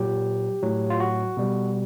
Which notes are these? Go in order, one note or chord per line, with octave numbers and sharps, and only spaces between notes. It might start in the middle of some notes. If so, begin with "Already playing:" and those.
Already playing: A#2 F#3 G4
A2 F#3
F4
F#4
B2 G3